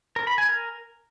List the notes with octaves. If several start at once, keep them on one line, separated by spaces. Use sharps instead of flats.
A#4
B5
G#5
A#4